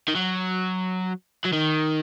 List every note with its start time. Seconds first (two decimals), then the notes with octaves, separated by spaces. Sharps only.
0.08 D#3
0.15 F#3
1.45 F#3
1.53 D#3